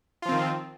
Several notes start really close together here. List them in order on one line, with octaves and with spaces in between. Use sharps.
F4 F3 C4 D#3